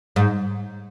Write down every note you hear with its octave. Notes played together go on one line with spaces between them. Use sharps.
G#2